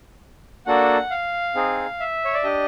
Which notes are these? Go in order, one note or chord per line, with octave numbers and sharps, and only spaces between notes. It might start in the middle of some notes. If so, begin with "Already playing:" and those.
A#3 D4 F#4 A4 F#5
F5
C4 D#4 G#4
E5
C#5
D5
D4 G4 D#5